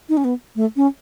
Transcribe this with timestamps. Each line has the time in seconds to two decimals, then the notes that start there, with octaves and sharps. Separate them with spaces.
0.09 D#4
0.17 C#4
0.24 B3
0.56 A3
0.76 C#4